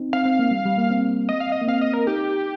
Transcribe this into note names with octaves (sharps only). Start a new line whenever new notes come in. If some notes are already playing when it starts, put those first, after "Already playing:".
Already playing: C4 D#4
C4 F5
C4
A#3
G3
G3
A#3
C4
D#5
F5
D#5
A#3
C4 F5
D#5
A#4
D#4 G4